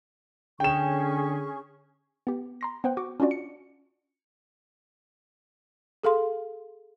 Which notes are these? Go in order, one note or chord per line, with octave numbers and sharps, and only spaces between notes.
D3 C#4 G#4 G5 C#6 E7
B3 G4
A#5 C6 A#6
B3 C5 F#5 G5
F#4 C#6 D6
C#4 D4 F4 F#4 D5
C#7
G#4 A4 F5 C6